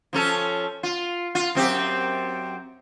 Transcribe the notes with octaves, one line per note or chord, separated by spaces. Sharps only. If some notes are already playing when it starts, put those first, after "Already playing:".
F3 C#4 A4
F4
F4
F#2 C4 G4